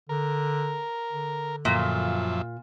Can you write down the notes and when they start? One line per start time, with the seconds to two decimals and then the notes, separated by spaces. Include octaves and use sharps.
0.09 D3 A#4
1.12 D3
1.65 F#2 A#2 F3 E5